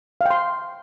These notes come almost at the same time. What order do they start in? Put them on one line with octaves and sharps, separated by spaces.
F5 G5 C6